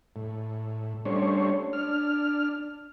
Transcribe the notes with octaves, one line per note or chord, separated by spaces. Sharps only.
A2
G3 A3 C#4 D4 C5 C#5
D4 F6